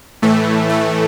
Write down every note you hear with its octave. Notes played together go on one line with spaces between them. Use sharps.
A2 E3 A3
A3